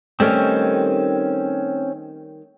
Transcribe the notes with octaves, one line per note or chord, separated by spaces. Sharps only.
D#3 G3 A3 C4 C#4